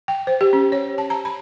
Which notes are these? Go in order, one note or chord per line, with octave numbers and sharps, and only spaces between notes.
G5
C5
G4
C#4
C#5
A5
A#5
B5